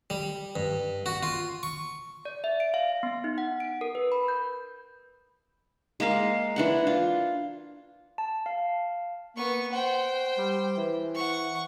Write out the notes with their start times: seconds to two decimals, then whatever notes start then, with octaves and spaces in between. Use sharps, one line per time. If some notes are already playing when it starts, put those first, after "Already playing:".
0.10 G3
0.56 G2
1.06 F#4
1.23 F4
1.63 C#6
2.25 D5
2.44 E5
2.60 D7
2.74 F5
3.03 B3
3.24 D#4
3.38 F#5
3.60 D7
3.81 A#4
3.95 B4
4.12 B5
4.28 G6
6.00 G#3 A#3 A#4 F5
6.56 E3 D4 F#5
6.87 F4
8.18 A5
8.46 F5
9.36 A#3 B3 C#6
9.73 C5 F#5 G5
10.38 G3
10.77 E3
11.14 F#5 C#6